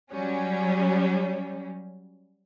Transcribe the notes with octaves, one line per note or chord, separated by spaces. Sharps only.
F#3 G3 C#4